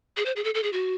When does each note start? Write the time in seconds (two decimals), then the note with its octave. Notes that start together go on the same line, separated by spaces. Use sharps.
0.17 G#4
0.26 C5
0.36 G#4
0.44 A4
0.55 A4
0.63 G#4
0.73 F#4